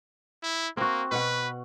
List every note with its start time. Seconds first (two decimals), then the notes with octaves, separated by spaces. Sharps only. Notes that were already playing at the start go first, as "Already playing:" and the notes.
0.43 E4
0.77 A#3 C4 F#4
1.11 B2 B4 F#5